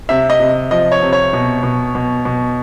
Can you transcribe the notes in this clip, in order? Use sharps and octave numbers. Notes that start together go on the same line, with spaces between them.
C3 E5
D#5
C3
F3 D#5
C#5
C3
C#5
B2
B2
B2
B2